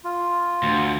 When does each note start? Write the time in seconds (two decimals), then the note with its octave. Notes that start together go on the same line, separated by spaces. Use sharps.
0.04 F4
0.63 D2